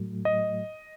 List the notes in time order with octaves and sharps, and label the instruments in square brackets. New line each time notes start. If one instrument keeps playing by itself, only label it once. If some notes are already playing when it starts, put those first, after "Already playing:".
Already playing: [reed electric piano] A2 F#3 A3
[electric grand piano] D#5